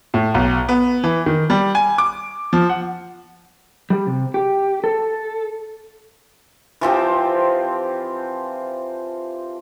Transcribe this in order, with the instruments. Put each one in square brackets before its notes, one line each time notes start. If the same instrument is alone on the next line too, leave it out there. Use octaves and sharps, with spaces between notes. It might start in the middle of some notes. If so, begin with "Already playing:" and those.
[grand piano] A2
B1
B3
E3
D#3
G3
G#5
D6
F3
F#5
[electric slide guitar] G3
C3
G4
A4
[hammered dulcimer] E3 F3 C4 G4